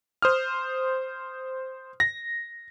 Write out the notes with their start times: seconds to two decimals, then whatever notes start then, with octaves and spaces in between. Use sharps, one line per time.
0.22 C5 D#6 F6
2.00 A#6